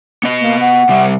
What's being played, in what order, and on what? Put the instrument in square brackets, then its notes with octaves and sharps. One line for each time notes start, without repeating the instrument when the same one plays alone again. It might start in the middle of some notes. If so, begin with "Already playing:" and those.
[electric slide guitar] B3 D#5
[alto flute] A#3
F#5
[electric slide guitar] C3 G3 E5